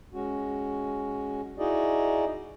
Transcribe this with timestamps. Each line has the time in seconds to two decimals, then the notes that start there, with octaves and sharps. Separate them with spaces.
0.14 G#3 C#4 F#4
1.58 D#4 E4 F#4 G#4 D5 D#5